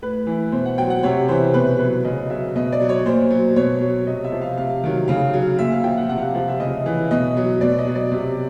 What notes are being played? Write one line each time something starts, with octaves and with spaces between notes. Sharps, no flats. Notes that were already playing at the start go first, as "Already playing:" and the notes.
A2 B4
E3
B2 C5
F#5
F#3 G5
F#5
C3 C#5
E3 C5
B2 B4
F#3 B4
C#3 D#5
F#3 E5
B2 D#5
D5
F#3
C#5
A#2 C5
F#3
B2 C#5
F#3
C3 D#5
E5
F3
F5
C3 F5
D#3 F#3
C#3 F5
F#3
A#2 E5
F5
F3 G5
F#5
C3 F#5
F5
F#5
F3 F5
E5
C#3 D#5
E3
B2 D#5
F#3
B2 D5
D#5
F#3
D5
C3